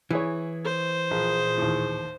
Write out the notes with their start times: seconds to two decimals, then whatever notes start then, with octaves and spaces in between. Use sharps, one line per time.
0.11 E3 E4 G#4 C#5
0.65 C5
1.11 A#1 A#2 G#4
1.58 D#2 A2